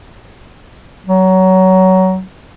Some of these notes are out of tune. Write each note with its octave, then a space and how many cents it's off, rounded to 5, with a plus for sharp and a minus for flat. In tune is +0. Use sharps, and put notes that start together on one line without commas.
F#3 +20